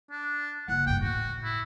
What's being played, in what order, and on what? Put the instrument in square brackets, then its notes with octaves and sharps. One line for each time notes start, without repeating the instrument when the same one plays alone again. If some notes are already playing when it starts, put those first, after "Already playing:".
[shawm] D4
[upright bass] F#1 F3 [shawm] F#5
[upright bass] D2 G2 [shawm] G5
[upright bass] A2 [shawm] F#4
[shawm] E4